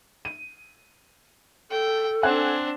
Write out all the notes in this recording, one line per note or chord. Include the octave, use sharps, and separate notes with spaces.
D#7
A4 G5
C4 D4 F#5 G#5 F#6